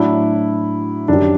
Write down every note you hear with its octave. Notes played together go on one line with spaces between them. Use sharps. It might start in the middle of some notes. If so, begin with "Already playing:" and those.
Already playing: A2 F#3 D4 E4
F#2 D#3 G3 D4